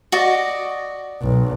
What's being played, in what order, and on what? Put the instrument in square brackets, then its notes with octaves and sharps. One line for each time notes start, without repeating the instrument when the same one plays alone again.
[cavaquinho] F#4 D5 D#5
[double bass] B1